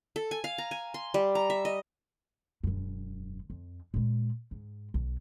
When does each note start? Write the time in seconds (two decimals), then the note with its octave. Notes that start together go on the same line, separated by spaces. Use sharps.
0.16 A4
0.31 G#5
0.44 F5
0.58 A#5
0.71 G#5
0.94 C6
1.14 G3
1.35 A#5
1.50 E5
1.65 D#5
2.63 E1 F#2
3.50 F2
3.94 A#2 G#3
4.51 G#2
4.94 B1